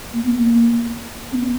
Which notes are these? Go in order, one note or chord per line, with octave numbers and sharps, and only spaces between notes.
A#3
B3
A#3
C4
B3